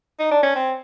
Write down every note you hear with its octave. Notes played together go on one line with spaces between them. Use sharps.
D#4
D4
C#4
C4